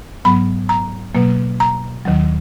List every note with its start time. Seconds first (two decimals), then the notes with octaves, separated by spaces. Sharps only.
0.25 G#2 F#3 B3 B5
0.69 A#5
1.15 B2 F#3 A#3
1.60 A#5
2.05 D#2 D#3 F#3